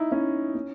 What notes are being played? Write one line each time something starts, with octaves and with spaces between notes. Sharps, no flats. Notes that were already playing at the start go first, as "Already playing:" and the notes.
Already playing: D#4 E4
C#4 E4
C#4